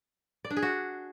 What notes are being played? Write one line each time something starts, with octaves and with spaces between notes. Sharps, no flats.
D5
D4
G#4
F#4